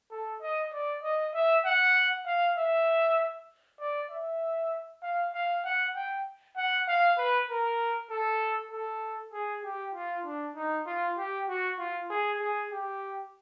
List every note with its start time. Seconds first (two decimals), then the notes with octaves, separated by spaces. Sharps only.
0.11 A4
0.41 D#5
0.73 D5
1.03 D#5
1.34 E5
1.65 F#5
2.26 F5
2.57 E5
3.80 D5
4.10 E5
5.03 F5
5.33 F5
5.64 F#5
5.95 G5
6.56 F#5
6.87 F5
7.18 B4
7.49 A#4
8.10 A4
8.71 A4
9.33 G#4
9.64 G4
9.94 F4
10.25 D4
10.56 D#4
10.86 F4
11.18 G4
11.48 F#4
11.79 F4
12.10 G#4
12.40 G#4
12.71 G4